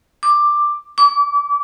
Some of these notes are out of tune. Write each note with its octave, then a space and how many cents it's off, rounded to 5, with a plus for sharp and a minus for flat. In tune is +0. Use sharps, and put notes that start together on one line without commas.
D6 +10
D6 -35